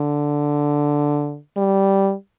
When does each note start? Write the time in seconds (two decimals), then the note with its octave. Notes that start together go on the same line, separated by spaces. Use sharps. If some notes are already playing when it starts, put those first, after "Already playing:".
Already playing: D3
1.56 G3